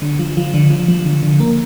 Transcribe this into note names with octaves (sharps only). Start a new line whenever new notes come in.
D3
F3
F3
D3
F3
F3
D3
D3
A#3